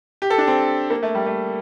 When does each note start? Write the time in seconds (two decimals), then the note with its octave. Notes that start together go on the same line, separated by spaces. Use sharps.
0.22 G4
0.30 A4
0.38 D4
0.47 C4
0.90 A#3
1.03 A3
1.15 G3
1.26 A3